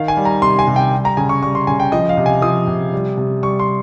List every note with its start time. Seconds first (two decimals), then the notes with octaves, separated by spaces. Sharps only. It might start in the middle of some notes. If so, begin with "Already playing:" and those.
Already playing: D#3 F5
0.08 G#5
0.17 G3
0.25 A#5
0.42 C3 C6
0.59 G#5
0.67 C3
0.76 G5
0.92 G3
1.05 A#5
1.17 C#3 G#5
1.29 C#6
1.42 G3 C#6
1.55 C6
1.67 C#3 G#5
1.80 G5
1.92 F3 D#5
2.09 F5
2.17 C3
2.26 G#5
2.42 F3 D#6
2.68 C3
2.93 G3
3.18 C3
3.43 G3 C#6
3.59 C6